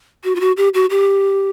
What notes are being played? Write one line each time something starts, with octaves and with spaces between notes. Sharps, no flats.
F#4
F4
F#4
G4
F#4
G4